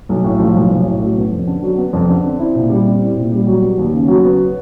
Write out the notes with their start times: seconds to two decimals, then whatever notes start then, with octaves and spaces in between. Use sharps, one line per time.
0.09 B1
0.24 A2
0.39 F3
0.55 B1
0.71 B1
0.86 A2
1.01 F#3
1.16 B3
1.31 F2
1.47 D3
1.63 F#3
1.78 B3
1.93 F2
2.09 D3
2.24 C4
2.39 E4
2.55 A#2
2.70 G3
2.85 C4
3.01 E4
3.16 A#2
3.32 G3
3.47 F#3
3.62 B3
3.78 D#2
3.92 C#3
4.08 F#3
4.24 B3